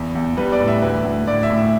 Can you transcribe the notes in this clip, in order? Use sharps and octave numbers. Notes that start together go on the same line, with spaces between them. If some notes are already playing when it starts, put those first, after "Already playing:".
Already playing: E2
E2
G3 B4
D5
A2
E5
D2 B4
D2
A2 D5
E5
A2
E5